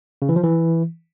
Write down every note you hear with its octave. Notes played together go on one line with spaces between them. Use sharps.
C#3
E3
F3
E3